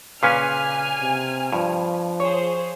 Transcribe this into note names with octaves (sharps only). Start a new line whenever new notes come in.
A#2 C#3 C#4 B4 F5 G#5 F6
C3
G2 F3
G#4 C5 C#5